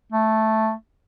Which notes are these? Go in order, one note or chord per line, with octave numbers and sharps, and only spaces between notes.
A3